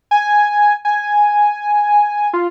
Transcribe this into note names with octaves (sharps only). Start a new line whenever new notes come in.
G#5
G#5
F4